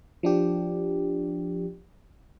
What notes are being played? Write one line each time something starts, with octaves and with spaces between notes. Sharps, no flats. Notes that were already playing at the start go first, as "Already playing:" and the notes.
F3 D4 G4